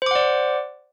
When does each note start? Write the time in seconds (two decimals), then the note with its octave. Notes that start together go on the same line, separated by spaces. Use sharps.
0.02 C5
0.06 D6
0.11 F#5
0.15 D5